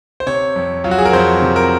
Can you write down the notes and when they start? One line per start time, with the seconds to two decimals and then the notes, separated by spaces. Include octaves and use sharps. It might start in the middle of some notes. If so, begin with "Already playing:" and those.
0.20 C5
0.27 C3 C#5
0.56 F2
0.84 F#3 F4
0.91 F#4
0.98 G#4
1.05 A#4
1.13 F2 C5
1.42 C3
1.56 A#4